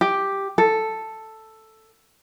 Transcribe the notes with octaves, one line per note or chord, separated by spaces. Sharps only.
G4
A4